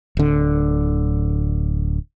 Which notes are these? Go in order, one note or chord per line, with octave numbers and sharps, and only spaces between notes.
D1 D3